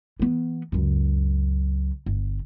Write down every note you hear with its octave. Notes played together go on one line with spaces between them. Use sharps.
E3 B3
C#2 F#2
G1